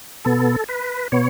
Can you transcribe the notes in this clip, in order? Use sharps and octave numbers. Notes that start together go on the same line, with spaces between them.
B2 B3 A4
B4
B2 B3 C#5